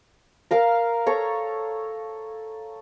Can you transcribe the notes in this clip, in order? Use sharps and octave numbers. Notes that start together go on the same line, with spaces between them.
A#4 F5 A#5
A4 C#5 A#5 C#6